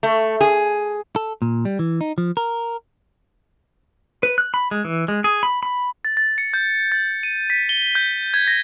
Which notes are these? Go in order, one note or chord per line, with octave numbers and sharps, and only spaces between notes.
A3
G#4
A4
A#2
G3
E3
D#4
F3
A#4
B4
F#6
B5
G#3
E3
G#3
G#4
B5
B5
A6
A6
C#7
G6
A6
D#7
B6
G7
G6
G#6
A#6